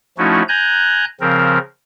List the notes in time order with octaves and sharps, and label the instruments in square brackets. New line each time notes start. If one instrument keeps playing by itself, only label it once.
[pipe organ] F3 A3 C#4 D#4 E4 F#4
G#5 A#5 F#6 G6
C#3 F3 C4 A#4